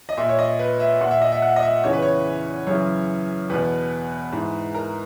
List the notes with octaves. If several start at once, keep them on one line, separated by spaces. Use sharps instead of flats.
D#5
A#2 E5
C#5
D#5
B4
E5
A#2 F#5
E5
D#5
E5
F#5
D#5
E5
E2 C#3 E3 C#5
B4
C#5
F#2 C#3 E3 C#5
E2 B2 B4
G#2 E3
A#4